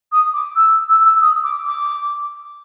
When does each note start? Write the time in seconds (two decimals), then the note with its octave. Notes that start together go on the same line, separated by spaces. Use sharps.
0.12 D#6
0.33 D6
0.56 E6
0.89 E6
1.04 E6
1.22 D#6
1.44 D6
1.66 D6